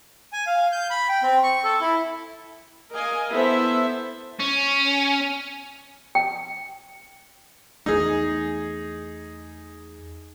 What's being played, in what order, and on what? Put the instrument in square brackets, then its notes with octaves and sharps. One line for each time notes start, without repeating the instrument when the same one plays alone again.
[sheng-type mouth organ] G#5
F5
G6
B5
G5
C4
C#6
A4
E4
[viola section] A#4 D#5 F5 G#5
B3 E4 A4 C5 E5
[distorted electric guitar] C#4
[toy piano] G5
[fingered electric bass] E2 E3 A3 [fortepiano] D#4 G#4